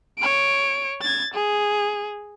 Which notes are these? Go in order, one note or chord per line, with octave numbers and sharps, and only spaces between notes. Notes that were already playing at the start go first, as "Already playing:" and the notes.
C#5 D7
G#6 A6
G#4